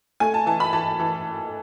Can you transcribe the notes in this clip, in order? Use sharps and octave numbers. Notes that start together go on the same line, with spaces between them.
A3 G#5
A5
E3 A5
B5
E3 A5
E3